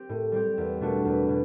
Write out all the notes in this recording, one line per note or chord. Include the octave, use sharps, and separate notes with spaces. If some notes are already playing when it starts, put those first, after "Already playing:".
Already playing: C4 G4
A2
G3 C4 G4
E2
B2 A3 D4 F#4
E2
B2